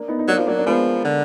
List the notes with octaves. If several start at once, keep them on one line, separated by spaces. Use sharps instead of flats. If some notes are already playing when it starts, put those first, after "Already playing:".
Already playing: A#3 D4
B3 D#4
D#4
F#3 A#3 D4
F3
F#3 A#3 D4
D4
F3 G#3 B3
D3